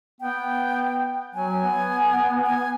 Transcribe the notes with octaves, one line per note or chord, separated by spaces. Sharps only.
B3 G5
F#3 G#5
B3
G#5